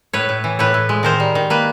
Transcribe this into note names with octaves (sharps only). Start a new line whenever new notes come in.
A2 B4 C#5
A2
E3
A2 B4 C#5
A2
G#3
D#3 A#4 C5
G3
D#3
A#3 B4